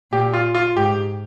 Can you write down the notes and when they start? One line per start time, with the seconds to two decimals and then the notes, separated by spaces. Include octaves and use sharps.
0.12 A#2 G4
0.33 F4
0.55 F4
0.77 G#2 G4